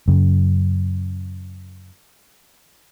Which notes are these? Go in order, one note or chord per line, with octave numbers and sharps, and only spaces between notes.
F#2 C#3